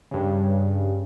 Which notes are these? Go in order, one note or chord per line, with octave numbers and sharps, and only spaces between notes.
G2 C#3